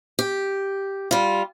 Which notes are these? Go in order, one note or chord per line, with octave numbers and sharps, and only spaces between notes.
G4
G3 F4